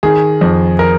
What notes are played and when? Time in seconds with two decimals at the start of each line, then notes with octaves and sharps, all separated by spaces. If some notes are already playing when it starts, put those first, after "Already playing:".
0.03 D#3 G#4
0.41 F2
0.79 A#4